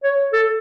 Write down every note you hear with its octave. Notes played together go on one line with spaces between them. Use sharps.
C#5
A4